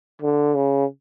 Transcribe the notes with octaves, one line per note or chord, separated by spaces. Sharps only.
D3
C#3